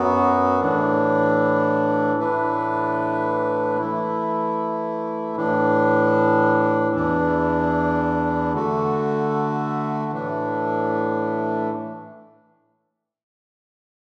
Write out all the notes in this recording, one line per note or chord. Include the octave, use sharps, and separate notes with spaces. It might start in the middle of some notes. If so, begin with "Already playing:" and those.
Already playing: F#2 F#3 B3 F#4
A2 E3 D4
A2 E3 A3 D4 B4
E3 A3 E4
A2 E3 D4
E2 E3 D4
D3 A3 F#4
A2 E3 A3 D4